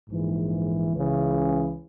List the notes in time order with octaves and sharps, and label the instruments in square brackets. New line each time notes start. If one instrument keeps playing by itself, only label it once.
[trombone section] A#1 G#2 E3
C#2 C#3 E3